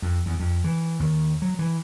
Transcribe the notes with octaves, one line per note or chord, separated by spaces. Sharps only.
F2
E2
F2
E3
D#2
F#3
E3